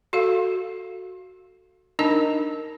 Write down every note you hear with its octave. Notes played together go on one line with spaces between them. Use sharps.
F#4 A4 F5
D4 D#4 A#4 D#5 A5